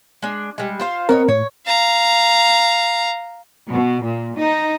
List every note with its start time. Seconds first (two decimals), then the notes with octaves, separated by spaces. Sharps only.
0.22 G#3 D4
0.58 G3 G#3
0.80 F4 C5 F5
1.09 B3 C4 A#4 C#5 D#5
1.29 A2 C#5
1.66 F5 A#5
3.69 B2
4.03 A#2
4.37 D#4